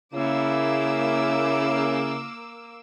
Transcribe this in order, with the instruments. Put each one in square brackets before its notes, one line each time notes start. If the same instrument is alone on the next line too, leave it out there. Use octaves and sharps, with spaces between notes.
[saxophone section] C#3 [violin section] A#3 D6 E6 [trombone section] E4